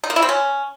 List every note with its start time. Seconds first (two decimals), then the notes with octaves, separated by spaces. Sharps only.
0.04 D#4
0.10 A#3
0.16 E4
0.22 C4
0.29 C#4